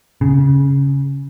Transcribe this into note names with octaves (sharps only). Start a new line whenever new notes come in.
C#3